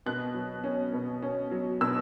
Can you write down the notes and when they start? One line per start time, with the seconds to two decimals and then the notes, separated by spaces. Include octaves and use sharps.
0.06 B2 F#6
0.34 F#3
0.64 C#4
0.93 B2
1.22 C#4
1.51 F#3
1.81 B2 E6